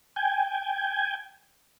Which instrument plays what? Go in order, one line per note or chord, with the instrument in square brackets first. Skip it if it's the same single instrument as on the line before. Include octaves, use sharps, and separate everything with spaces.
[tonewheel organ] G5 G#5